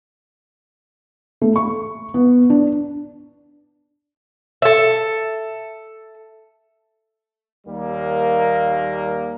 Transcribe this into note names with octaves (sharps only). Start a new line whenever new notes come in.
A3
C#6
B3
D4
A4 E5
D#2 G3 A#3